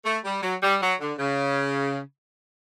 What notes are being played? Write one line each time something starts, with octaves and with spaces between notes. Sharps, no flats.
A3
G3
F#3
G3
F#3
D3
C#3